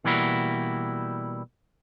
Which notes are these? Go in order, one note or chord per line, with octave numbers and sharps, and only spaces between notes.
B2 E3 G3 A#3 E4 F#4